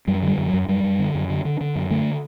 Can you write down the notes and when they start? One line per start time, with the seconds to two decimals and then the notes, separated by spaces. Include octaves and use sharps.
0.07 F#2 G3
0.22 D3
0.28 G3
0.38 F#2
0.48 F#3
0.53 F#2
0.68 F#2 G3
0.84 F#2
0.99 D3
1.15 F#2
1.30 D3
1.45 D3
1.61 D3
1.76 F#2
1.90 D3 A3